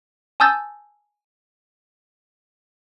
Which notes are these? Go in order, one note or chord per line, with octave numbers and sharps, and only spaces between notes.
G#5 A5 D#6 E6 G6 A6